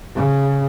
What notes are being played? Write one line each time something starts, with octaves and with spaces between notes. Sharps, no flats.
C#3